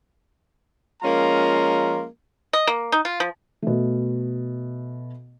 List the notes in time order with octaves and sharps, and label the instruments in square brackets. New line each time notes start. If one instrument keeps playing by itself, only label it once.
[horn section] F3 G#3 A#3 C#4 F4 A#5
[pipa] D#5
A#3
D#4
F4
F3
[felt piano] B2 A3